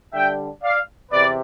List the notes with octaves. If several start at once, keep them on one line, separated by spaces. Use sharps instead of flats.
D3 G3 D4 E5 G5
D5 F5
E2 C3 B4 D5